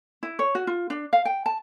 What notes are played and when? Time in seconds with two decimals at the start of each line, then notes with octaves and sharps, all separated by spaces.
0.23 E4
0.39 C#5
0.55 F#4
0.67 F4
0.90 D4
1.13 F5
1.25 G5
1.46 A5